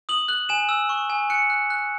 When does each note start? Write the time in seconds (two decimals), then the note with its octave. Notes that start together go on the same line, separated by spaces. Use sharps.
0.09 D#6 F#7
0.28 F#6 F#7
0.49 G#5 E7
0.69 E6
0.89 C#6
1.10 G#5
1.30 F#6 C#7
1.50 F#6
1.70 F#6